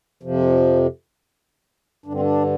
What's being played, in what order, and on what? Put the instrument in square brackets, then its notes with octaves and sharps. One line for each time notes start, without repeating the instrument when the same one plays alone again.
[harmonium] F2 C3 F3
G2 D3 D4
C4
D4